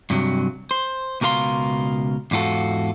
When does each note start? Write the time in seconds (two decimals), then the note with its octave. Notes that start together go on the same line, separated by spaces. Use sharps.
0.10 G2 C3 F#3
0.71 C5
1.21 C#2 B2 A#4 F5 C6
2.31 E2 G#2 F4 F#4 A4